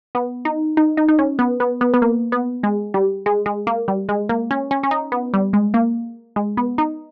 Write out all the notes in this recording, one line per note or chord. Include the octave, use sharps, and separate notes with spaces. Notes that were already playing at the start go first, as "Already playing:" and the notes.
B3
D#4
D#4
D#4
D#4
C#4
B3
B3
B3
B3
A#3
B3
G#3
G3
G#3
G#3
A#3
G3
G#3
A#3
C#4
C#4
C#4
D#4
B3
G3
G#3
A#3
G#3
B3
D#4